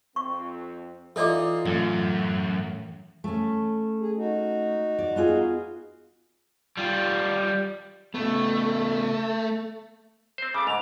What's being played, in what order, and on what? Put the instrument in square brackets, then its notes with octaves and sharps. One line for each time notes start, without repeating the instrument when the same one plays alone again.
[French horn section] F2 C4 [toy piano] C#6
[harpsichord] E3 D#4 [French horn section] F4 [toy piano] A4 D5 D6
[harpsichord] A1 [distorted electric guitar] F#2
[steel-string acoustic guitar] A3 C#4
[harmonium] G#4
D#4 F#4
[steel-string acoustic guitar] D5
B3 F4 G#4
[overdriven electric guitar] G3 F4
[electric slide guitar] C#3 B3 [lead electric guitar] A3
[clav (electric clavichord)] C4 C5
[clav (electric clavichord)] C#3 A3 [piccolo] D6
[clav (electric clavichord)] G#2 [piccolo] F7